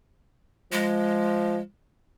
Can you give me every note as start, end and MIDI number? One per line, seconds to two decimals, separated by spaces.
0.72 1.59 53
0.72 1.61 56